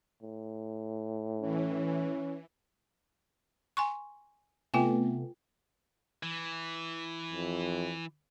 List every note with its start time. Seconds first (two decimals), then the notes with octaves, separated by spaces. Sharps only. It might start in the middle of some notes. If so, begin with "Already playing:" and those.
0.22 A2
1.41 E3 C#4
3.77 G#5 C6 C#6
4.74 C3 A3 B3 F4 G5 G#5
6.23 E3
7.33 F2